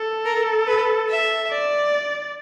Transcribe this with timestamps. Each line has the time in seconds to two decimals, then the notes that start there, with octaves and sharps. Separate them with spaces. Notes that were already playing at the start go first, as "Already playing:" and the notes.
Already playing: A4
0.25 A#4
0.67 B4
1.09 E5
1.51 D5